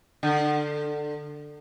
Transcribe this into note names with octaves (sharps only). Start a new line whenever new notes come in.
D3